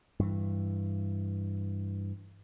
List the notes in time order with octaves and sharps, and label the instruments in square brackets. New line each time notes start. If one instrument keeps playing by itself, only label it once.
[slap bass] G2 E3